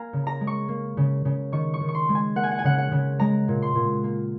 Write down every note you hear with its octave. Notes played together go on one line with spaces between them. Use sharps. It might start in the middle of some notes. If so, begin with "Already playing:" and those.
Already playing: A#3 F5 G#5 A#5
C#3
A#5
G#3
C#6
A#3
C#3
C#3
D#3 C#6
C#6
D#3
C#6
C6
G#3
G#5
A#3 F#5
G#5
F#5
G#5
C#3 F#5
F#5
C#3
G#3 A#5
A#2
C6
A#2
A#3